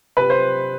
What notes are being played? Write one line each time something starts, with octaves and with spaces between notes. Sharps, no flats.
C3 B4
C5